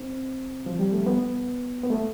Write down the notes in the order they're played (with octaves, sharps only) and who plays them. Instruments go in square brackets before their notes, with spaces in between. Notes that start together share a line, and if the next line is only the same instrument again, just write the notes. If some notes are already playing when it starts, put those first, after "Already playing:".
Already playing: [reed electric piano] C4
F3
G3
A3
B3
B3
A3